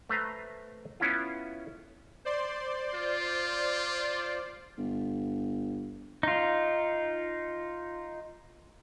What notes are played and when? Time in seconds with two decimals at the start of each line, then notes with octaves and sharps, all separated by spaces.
0.09 A3 B4 C5 A#5
1.00 B3 C#4 E4 F4
2.25 C5 D5 C6
2.94 F4
4.78 G1
6.23 D#4 F4